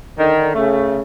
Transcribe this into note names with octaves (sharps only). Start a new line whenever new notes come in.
D3 D#3
C#3 A3